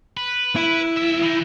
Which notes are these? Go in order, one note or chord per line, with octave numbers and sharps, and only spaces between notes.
B4
E4
B1 E5
E3 D#4